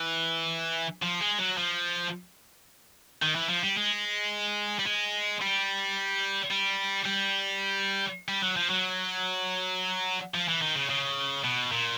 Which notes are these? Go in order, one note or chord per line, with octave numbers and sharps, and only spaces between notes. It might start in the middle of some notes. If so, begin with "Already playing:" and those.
Already playing: E3
F3
G#3
F#3
F3
D#3
E3
F3
G3
G#3
G3
G#3
G3
G3
G3
G3
F#3
F3
F#3
F3
E3
D#3
C#3
C#3
B2
A#2